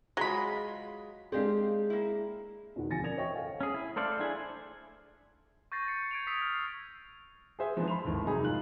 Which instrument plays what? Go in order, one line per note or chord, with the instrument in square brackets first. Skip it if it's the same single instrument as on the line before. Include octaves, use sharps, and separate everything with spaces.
[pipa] F#3 B5 [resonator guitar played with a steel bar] G#3 F4 G#4
[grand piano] G#3 D4 G#4 [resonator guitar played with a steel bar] C4 G4 F5
[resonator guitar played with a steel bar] A#3 E4
[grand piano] E2 B2 D#3 F#5
D1 F3 G#5 A6 A#6 C#7
F#2 A#4 D5 G#6 A#6 F7
C5 C#5 D#5 E5 G5 C#6
A4 F5 F#5 G#5
[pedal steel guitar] C#4 G#4
E4
A3 A4 C5 D5 F5
D4 E4 G#4 G#5
C5
[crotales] C#6 G6 A6 A#6 C7 D#7
G6 C7 C#7
G#6 D7 F7
D#6 E6 B6 C7 D7 F7
F6
[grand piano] G#4 B4 C5 E5 G#5
D#3 F3 G#3 B3 C4 D4
B5 C6 F7
G#1 D#2 A2
F1 C3 F#3 D#4 G#4 B5
G#2 D#3 F4 F#6 F#7